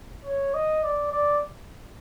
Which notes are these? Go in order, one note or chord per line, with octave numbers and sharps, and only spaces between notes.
C#5
D#5
D5
D5